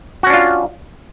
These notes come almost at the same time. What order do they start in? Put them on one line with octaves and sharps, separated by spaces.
F#4 C#4 D4 F4